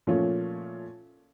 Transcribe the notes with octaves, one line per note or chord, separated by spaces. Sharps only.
A#2 F3 A3 C#4 F4